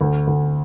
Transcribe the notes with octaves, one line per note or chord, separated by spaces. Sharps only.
D2
D2